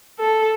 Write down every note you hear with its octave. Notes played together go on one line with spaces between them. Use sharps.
A4